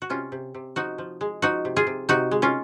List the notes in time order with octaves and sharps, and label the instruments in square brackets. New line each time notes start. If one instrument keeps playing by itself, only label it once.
[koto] F#4
C3 C#4 F4
C3
C3
F3 D#4 F#4
F3
G#3
F3 D#4 F#4
C3
F4 G#4
C3
C3 D#4 F#4
G#3
C#4 F4